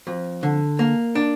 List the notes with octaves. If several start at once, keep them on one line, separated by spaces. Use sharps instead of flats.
F2
D3
A#3
D4